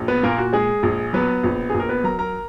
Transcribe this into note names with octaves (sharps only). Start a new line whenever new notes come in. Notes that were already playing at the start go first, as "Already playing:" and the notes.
Already playing: A#1
B3 B4
A#2 A#3 A#4
F#4
G#3 G#4
A#1
F#3 B3 B4
A#1
A#1 G#4
A#4
B3 B4
F#3 A#4 A#5
A#4 A#5